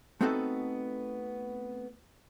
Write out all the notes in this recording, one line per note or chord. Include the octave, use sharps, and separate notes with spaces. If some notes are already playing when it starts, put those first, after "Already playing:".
A3 B3 C4 D#4 F#4 A4